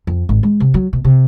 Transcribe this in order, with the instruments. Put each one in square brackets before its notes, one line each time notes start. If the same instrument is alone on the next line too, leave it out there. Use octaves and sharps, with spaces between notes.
[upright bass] F2
G#1
G#3
C3
F#3
B2
C3